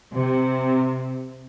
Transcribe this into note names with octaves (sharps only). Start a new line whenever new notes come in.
C3